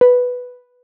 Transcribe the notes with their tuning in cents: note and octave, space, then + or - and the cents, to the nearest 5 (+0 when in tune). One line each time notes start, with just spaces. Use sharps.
B4 +0